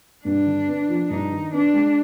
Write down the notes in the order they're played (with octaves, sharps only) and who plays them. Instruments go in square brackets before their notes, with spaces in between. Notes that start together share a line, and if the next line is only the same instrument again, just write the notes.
[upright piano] G2 [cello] D4
[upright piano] D3
B3
F3
[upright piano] G2 [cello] D#4
[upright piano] D#3
[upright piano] B3 [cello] D4
[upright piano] G#3